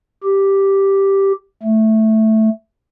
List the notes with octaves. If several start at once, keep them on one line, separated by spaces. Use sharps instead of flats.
G4
A3